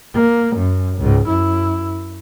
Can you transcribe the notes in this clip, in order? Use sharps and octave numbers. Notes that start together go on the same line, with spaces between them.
A#3
F#2
C#2 G#2
F#2 E4